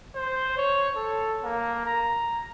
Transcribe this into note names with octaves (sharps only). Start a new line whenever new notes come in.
C5
C#5
A4
A#3
A#5